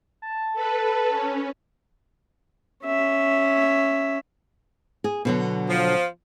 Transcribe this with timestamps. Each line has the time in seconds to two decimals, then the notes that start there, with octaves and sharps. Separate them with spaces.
0.22 A5
0.53 A4 B4
1.09 C#4
2.85 C#4 E5
5.04 G#4
5.25 B2 D3 F#3
5.67 F3